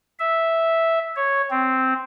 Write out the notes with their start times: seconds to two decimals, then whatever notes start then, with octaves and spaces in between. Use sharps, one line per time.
0.19 E5
1.16 C#5
1.50 C4